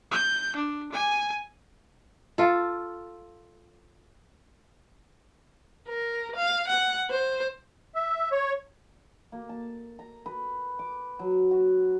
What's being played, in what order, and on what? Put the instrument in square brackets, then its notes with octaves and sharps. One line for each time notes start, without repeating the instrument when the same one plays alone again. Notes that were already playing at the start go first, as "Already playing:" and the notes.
[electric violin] G6
D4
G#5
[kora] F4 A4
[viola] A#4
F5
F#5
C5
[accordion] E5
C#5
[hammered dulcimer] A#3
A5
A#5
B4
D6
F#3
F#4